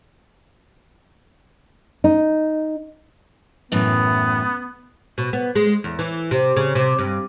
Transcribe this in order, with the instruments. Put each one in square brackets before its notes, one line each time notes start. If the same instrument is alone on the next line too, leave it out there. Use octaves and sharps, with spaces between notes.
[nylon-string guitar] D#4
[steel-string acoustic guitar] F#2 A2 E3 [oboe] B3
[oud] B2
B3
G#3
E2
E3
C3
C#3
C3
G2